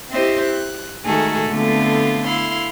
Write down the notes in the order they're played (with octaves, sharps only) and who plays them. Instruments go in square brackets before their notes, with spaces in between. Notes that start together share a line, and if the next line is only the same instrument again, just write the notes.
[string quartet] C4 E4 G4 C5 D#5
F#6
D#3 G#3 A3 F#4 G#4 A4
D3 A3 B3 C4 F4
E4 F5 C6